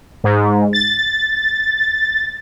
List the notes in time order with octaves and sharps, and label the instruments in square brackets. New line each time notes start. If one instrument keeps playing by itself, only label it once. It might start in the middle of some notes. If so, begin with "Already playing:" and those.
[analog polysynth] G#2
A6